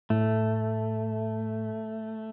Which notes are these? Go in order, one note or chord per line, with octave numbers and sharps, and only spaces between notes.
A2 A3